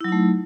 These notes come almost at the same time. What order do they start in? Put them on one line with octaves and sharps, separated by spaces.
E4 F#3 D#4 A3